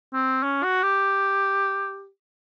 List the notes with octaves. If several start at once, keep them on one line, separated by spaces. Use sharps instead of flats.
C4
C#4
F#4
G4